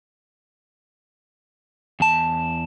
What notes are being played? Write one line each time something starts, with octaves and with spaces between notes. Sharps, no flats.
E2 A5